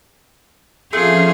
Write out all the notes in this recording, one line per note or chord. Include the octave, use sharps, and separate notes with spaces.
F3 A3 C4 C#4 F4 G#4